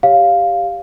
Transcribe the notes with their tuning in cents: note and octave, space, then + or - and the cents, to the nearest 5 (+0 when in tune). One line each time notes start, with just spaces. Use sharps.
G4 +5 C#5 +0 F5 +0